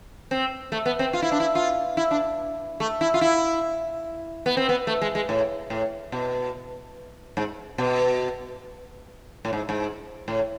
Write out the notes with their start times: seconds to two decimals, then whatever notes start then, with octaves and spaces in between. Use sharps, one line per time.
0.31 C4
0.72 A3
0.86 B3
0.99 C4
1.13 F4
1.22 E4
1.32 D4
1.40 E4
1.55 F4
1.97 E4
2.11 D4
2.80 A3
3.01 E4
3.14 F4
3.21 E4
4.46 B3
4.57 C4
4.69 B3
4.87 A3
5.01 G#3
5.15 G#3
5.29 A2
5.70 A2
6.12 B2
7.37 G#2
7.78 B2
9.45 A2
9.53 G#2
9.69 G#2
10.28 A2